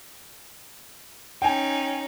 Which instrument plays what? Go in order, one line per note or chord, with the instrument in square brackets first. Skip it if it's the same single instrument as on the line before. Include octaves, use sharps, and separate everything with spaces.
[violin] C#4 D#4 [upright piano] G5 G#5